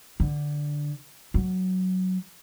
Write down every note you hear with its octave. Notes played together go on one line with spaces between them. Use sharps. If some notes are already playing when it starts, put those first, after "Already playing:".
D3
F#3